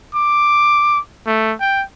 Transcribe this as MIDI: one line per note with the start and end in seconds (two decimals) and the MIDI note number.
0.15 0.99 86
1.27 1.54 57
1.60 1.83 79